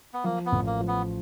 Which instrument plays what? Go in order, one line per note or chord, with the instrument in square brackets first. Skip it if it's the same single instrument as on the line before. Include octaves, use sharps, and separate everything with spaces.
[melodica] B3
[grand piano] F3 [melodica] A#3
[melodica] B3
[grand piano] A1
[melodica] A#3
[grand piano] F3
[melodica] B3